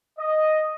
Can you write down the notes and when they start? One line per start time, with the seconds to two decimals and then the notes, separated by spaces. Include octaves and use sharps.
0.19 D#5